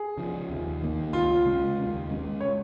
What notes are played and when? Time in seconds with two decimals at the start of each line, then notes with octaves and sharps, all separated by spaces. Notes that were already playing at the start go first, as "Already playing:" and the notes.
Already playing: G#4
0.17 C#3 F3
0.50 D#2
0.82 D#3 A#3
1.13 C#2 F4
1.46 C#3 G#3 C#4
1.77 D#2
2.09 C#3 G#3 C#4
2.40 C#5